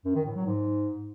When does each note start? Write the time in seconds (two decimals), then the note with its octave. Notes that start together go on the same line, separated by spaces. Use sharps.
0.05 F#2
0.15 D#3
0.26 A2
0.36 F#3
0.46 G#2